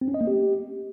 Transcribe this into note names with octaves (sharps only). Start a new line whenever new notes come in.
C4
C#4
D#5
A#3
G4